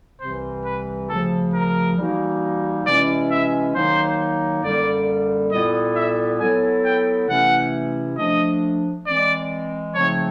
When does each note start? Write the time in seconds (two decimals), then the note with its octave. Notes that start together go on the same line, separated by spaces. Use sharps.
0.20 C2 C3 E3 G3 C4 C5
0.65 B4
1.09 D2 C#3 F3 A4
1.54 A#4
1.97 E3 G3 A#3 D#4 F#4
2.86 C3 E3 G#3 C#4 E4 D5
3.31 E5
3.74 D#3 F#3 A#3 D#4 C5
4.63 F#2 D3 G3 A#3 D5
5.51 A#2 G3 B3 E4 A4 D#5
5.96 E5
6.40 F#3 B3 E4 A4 G#5
6.85 G5
7.29 C3 E3 A3 C#4 E4 F#5
8.18 F3 A3 D4 D#5
9.06 E3 G#3 C4 D5
9.95 C#3 F3 A3 C4 D#4 C#5